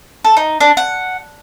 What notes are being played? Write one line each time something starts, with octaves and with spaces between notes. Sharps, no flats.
A4
D#4
D4
F#5